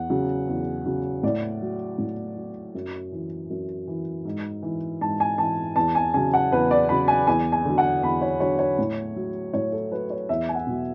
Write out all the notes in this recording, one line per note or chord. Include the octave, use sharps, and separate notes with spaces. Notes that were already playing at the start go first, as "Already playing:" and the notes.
Already playing: E2 F#5
C#3 F#3
E2
C#3 F#3
A2 D5
F#3
A2
F#3
F#2
E3
F#2
E3
G#2
E3
G#2 A5
G#5
E3 A5
E2 A5
G#5
C#3 F#3 G#5
F#5
E2 B4
D5
C#3 F#3 B5
G#5
E2 G#5
G#5
D3 F#3
F#5
E2 B5
C#5
D3 F#3 C#5
C#5
A2
F#3
A2 C#5
A4
F#3 B4
C#5
E2 E5
G#5
F#5
B2 F#3